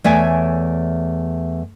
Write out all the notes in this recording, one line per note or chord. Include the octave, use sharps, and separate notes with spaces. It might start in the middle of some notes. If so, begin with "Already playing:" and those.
E2 A3 C#5 D5 E5 G#5